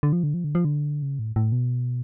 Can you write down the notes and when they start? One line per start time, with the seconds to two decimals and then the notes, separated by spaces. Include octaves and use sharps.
0.03 D3
0.13 F3
0.23 D3
0.34 F3
0.44 D3
0.55 F3
0.65 D3
1.02 C#3
1.19 A2
1.36 A2
1.52 B2